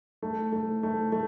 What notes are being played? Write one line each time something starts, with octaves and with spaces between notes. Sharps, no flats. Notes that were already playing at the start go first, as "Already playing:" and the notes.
A3
A3
A3
A3